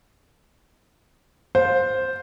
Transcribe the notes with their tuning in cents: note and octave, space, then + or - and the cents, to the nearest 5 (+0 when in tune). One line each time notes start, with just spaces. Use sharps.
C5 +0 F5 +30